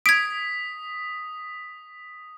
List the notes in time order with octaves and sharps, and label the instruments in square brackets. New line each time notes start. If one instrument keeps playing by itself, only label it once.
[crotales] D#6 B6 [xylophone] G#6 D7